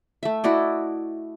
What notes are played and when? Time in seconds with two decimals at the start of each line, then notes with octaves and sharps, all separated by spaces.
0.23 A3 E5
0.44 E4 F#4 D5 D#5